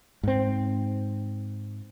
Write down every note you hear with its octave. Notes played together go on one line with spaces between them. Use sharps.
G#2 C4